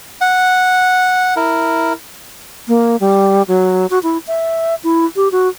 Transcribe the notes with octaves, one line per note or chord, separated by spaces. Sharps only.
F#5
E4 A#4
A#3
G3
F#3
F#4
E4
E5
E4
G4
F#4